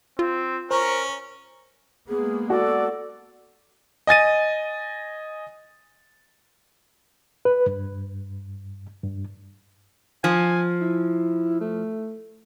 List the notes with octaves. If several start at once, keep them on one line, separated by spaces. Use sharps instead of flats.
C4 F4
C#4 A#4 C5 A#5 C#6
G#3 A#3 B3 G#4
F#4 A4 D5
D#5 G#5 A6 D#7
B4
G2
G2
F3 G#5
E4
A3